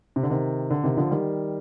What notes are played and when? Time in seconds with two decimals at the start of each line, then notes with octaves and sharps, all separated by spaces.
0.16 C3
0.23 D3
0.30 C3 D#3
0.70 D3
0.84 C3 D#3
0.97 D3 F3
1.11 D#3 G3